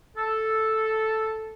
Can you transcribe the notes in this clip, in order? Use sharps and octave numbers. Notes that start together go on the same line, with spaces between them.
A4